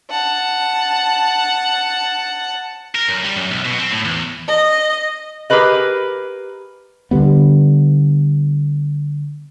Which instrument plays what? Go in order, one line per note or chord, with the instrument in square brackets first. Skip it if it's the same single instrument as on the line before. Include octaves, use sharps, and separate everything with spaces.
[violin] F#5 A5
[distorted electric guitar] A#4
F#2
G3
F#2
B1
B2
C4
A2
E2
[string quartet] D#5
[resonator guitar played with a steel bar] G4 G#4 A#4 B4 D#5
[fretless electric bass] D3 E3 G3 B3